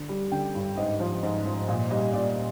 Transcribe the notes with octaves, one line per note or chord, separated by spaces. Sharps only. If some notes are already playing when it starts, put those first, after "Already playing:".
Already playing: D3
G3
D3 G5
G2
G#2 D#5
F3
G#2
F3
A#2 D#5
G3 D#5
A#2 D5